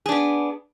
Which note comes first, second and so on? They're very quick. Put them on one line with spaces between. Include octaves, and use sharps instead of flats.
G#4 D4 B3